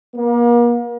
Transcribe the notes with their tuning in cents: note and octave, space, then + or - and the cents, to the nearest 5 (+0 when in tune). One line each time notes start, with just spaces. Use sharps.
A#3 +40